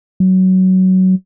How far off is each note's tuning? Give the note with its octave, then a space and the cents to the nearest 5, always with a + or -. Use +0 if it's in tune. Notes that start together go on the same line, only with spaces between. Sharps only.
F#3 +15